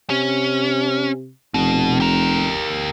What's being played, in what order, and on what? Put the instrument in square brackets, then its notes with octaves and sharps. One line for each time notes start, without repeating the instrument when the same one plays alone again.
[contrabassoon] C3 [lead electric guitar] C#4
[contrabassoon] F1 [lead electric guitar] B2
[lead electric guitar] G4 A#4